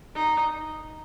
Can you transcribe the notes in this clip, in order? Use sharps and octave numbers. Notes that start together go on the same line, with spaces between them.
D#4